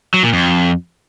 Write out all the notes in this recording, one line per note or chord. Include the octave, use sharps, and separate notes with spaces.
F#3
A#2
F2